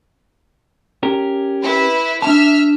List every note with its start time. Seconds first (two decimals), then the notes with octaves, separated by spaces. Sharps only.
1.03 C#4 G4 A#4
1.61 E4 B4
2.22 D4 E5 A5 F6